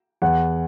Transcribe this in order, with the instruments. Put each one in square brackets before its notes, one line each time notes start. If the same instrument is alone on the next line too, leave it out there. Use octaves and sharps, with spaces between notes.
[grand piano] E2 F#5